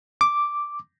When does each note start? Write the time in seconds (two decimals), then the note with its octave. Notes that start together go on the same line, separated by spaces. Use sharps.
0.21 D6